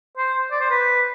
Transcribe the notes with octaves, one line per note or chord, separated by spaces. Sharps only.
C5
D5
C5
B4